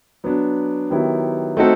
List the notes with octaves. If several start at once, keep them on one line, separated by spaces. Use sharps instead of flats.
F#3 B3 D4
D#3 F#3 B3 E4 G4
A3 C4 D#4 F#4 A4